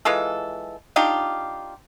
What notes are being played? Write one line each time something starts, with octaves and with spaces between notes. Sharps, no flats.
E3 G#3 F4 A4
D4 D#4 F4 G4